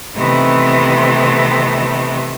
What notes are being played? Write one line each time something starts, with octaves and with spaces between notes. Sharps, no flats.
C3 D#3 E3 A3 B3 C4